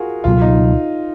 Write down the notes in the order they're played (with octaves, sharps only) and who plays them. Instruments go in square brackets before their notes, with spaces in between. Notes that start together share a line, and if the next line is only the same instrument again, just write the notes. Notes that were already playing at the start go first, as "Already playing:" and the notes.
Already playing: [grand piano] F4 F#4 G#4 A#4
[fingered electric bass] C#2 B2 F#3 [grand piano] F4
[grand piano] D#4